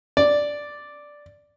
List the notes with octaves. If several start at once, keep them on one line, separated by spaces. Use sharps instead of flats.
D5